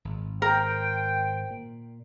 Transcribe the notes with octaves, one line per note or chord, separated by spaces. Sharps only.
G#1
A#4 C5 G5
A#2